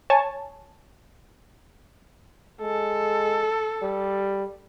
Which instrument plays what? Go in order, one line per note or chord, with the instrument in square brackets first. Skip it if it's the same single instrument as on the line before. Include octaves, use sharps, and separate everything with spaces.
[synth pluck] C#5 G#5 A5
[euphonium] G#3 [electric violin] A4
[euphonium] G3